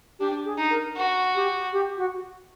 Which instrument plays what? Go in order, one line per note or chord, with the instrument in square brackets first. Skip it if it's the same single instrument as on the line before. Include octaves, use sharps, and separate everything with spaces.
[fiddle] D4 [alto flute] G4
[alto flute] G#4
[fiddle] D#4
[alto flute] A#4
[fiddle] F#4
[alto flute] G4
G4
F#4